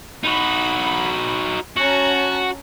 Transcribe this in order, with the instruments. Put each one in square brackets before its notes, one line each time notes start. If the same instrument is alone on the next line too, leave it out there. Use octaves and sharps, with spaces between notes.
[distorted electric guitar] D#4 F#4 [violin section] B5
[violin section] C#4 A5 A#5 [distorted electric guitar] F#4